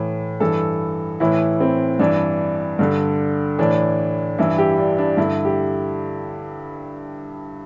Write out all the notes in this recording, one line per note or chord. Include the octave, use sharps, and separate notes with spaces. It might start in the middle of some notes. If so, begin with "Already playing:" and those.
Already playing: A2 E3
G2 E3 A4
A2 E3 E4
C4
G2 E3 D4
G2 D3
A2 E3 D4
G2 E3 E4
G4
D4
D4
G2 D3 E4
G4